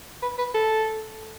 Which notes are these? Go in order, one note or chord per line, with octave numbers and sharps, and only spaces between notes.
B4
B4
A4